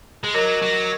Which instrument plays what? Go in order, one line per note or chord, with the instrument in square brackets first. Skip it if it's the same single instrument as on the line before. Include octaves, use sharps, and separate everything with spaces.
[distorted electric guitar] G#3
[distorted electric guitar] F#3 [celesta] A#4 D#5 A#5 D6
[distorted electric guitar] F#3